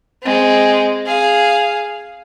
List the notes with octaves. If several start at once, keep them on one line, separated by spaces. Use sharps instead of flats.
G#3 C4
G#4 F5